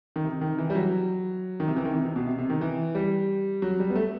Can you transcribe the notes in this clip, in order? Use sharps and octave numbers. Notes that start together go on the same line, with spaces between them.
D#3
C3
D#3
E3
G3
F#3
D#3
C3
E3
D#3
C3
C3
B2
C3
C3
D#3
E3
G3
F#3
G3
B3
A3